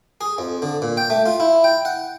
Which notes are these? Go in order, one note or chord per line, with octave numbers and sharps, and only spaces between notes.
G#4
F2
D3
A#2
G5
A3
F4
E4
G5
F#5